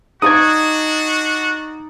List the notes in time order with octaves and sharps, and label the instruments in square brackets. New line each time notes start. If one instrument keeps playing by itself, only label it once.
[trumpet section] D4 F#4 [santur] D#4 D5 D6 [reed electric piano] D#6 G#6